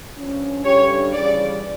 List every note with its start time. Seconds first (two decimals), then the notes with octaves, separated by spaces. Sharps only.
0.18 G2 F3 C#4
0.65 G2 D3 G3 C#4 G4 C#5
1.12 C#3 E3 G3 D5